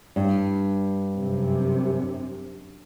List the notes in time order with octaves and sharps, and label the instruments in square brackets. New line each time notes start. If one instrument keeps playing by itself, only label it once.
[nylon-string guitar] G2
[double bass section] F#2 C3